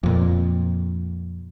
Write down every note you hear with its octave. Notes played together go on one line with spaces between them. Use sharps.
F2 A#2